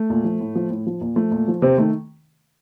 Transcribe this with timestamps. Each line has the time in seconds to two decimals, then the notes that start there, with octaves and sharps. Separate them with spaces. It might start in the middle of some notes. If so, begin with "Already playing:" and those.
Already playing: A3
0.10 A#2
0.24 F3
0.40 A2
0.55 F3
0.70 A2
0.87 F3
1.01 A#2
1.16 F3 A3
1.31 A#2
1.48 F3
1.62 C3 C4
1.77 D#3 A3